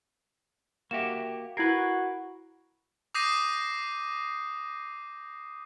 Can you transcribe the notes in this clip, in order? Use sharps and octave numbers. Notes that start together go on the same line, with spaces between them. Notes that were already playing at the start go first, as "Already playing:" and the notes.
A#3 F#4 G4 E5 E7
E4 F#4 A#4 B4 G#6 C7
D6 D#6 G6 A#6 C7 D#7